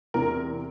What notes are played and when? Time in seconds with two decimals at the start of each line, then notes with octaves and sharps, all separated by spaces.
0.14 E2 C3 E3 A#4